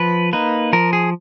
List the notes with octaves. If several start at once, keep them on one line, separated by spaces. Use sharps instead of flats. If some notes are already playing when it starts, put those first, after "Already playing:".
Already playing: F3 B4
A#3 D#4 B4
F3 A#4
G#4